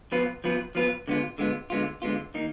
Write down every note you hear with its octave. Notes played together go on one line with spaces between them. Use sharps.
F3 B3 F4 B4
F3 B3 F4 B4
F3 B3 F4 B4
D3 G#3 B3 F4
D3 G#3 B3 F4
D3 G#3 B3 F4
D3 G#3 B3 F4
D#3 A#3 D#4